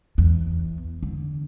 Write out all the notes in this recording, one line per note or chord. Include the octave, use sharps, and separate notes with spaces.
E2
D3